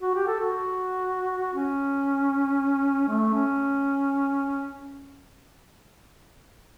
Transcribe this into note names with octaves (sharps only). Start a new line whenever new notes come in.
F#4
G4
A4
F#4
C#4
A3
C#4